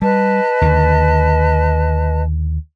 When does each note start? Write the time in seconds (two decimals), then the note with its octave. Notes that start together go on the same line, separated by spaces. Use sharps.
0.02 G3 B4 D#5 A5
0.62 D#2 D3